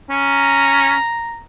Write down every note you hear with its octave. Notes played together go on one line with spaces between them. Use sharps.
C#4 A#5